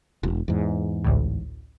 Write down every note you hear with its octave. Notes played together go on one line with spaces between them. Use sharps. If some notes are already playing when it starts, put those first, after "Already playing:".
E1
E2 G#2
A1 D2 A2